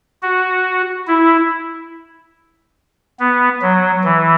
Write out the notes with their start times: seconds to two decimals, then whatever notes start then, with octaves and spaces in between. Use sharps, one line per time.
0.22 F#4
1.07 E4
3.19 B3
3.62 F#3
4.04 E3